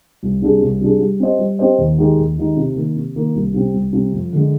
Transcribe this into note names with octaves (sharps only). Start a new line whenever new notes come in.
C2
C3 G3 D4 G#4
C2
C3 G3 D4 G#4
G3
C4 G4 C5 D#5
G3
C4 G4 C5 D#5
D#2
D#3 G#3 D#4 G4
D#2
D#3 G#3 D#4 G4
C3
D#3 A#3
C3
D#3 A#3
C2
C3 G3 C4
C2
C3 G3 C4
F2
D3 G#3